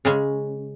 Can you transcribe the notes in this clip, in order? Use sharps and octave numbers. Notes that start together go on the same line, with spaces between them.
C#3 G#3 C#4